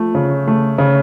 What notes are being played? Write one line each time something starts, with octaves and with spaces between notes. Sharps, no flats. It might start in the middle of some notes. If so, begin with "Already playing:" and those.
Already playing: F3 A3
C#3
A3
C#3